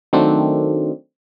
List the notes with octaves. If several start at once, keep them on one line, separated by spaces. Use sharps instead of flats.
D#3 F#3 A3 C4 D4